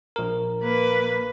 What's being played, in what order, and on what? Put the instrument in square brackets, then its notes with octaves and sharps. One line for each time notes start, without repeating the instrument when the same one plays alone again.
[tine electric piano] A#1 A#4
[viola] A#3 B4